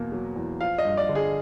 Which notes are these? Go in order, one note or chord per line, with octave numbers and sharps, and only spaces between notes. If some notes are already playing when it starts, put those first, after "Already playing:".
Already playing: E2 B2 A#3
F#3
E2
F3 F5
D#5
G2
D5
D3
G#4